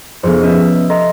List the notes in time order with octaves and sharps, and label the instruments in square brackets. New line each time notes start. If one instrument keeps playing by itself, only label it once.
[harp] F1 F2 [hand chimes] B3 G#4 C5
[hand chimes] B3 C#4 B4 [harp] D#5 E5
[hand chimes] A4 D#5 C6 [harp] A#5